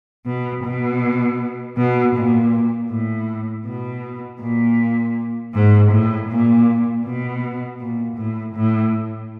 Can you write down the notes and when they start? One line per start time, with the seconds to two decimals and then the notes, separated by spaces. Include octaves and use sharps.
0.26 B2
0.64 B2
1.77 B2
2.15 A#2
2.90 A2
3.66 B2
4.40 A#2
5.54 G#2
5.91 A2
6.29 A#2
7.05 B2
7.80 A#2
8.17 A2
8.55 A2